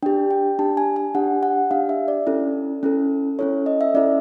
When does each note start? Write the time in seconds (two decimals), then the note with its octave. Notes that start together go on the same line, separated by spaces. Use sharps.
0.03 D4 G4 G5
0.31 G5
0.59 D4 G4 A5
0.77 G#5
0.96 G#5
1.14 D4 G4 F#5
1.43 F#5
1.71 D4 G4 F5
1.89 E5
2.08 D5
2.27 C#4 E4 A4
2.83 C#4 E4 A4
3.39 C#4 E4 A4 C#5
3.66 D#5
3.81 E5
3.94 C#4 E4 A4 D5